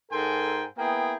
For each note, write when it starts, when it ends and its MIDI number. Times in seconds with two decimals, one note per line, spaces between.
0.11 0.64 44
0.11 0.64 69
0.11 0.64 70
0.11 0.64 79
0.11 0.64 80
0.11 0.64 84
0.78 1.14 58
0.78 1.14 59
0.78 1.14 64
0.78 1.14 68
0.78 1.14 79